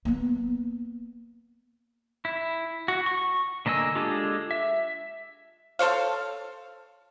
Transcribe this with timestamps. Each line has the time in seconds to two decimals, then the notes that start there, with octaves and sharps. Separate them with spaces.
0.05 A#3 B3
2.25 E4
2.88 F#4
3.06 C#6
3.66 D3 A#3 D#5 G#5 E6
3.95 G#3 D4 F4 G4 A4
4.51 E5
5.79 A4 C5 C#5 F5